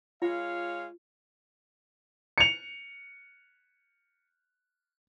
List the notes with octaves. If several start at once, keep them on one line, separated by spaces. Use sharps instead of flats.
G#3 F4 C#5 F5
C#7 F7